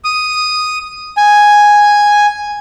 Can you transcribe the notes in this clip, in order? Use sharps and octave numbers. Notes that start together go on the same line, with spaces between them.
D#6
G#5